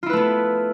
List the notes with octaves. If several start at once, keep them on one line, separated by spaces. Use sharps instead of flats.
A3 B3 E4 F4 B4